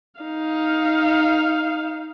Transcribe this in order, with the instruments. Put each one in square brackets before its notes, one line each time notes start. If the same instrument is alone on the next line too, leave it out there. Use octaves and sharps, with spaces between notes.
[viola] D#4 F5